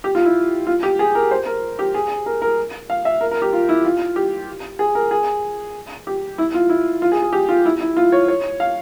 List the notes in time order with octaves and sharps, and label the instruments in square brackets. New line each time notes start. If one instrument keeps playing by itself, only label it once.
[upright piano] G4
F4
E4
F4
G4
G#4
A#4
C5
A#4
G4
G#4
A#4
A#4
F5
E5
A#4
A#4
G4
F4
E4
F4
G4
G#4
A#4
G#4
G4
E4
F4
E4
F4
G#4
G#4
G4
F4
E4
E4
F4
C#5
C#5
F5